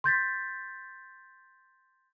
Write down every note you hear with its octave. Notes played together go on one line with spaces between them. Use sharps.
C6 G6 A6 B6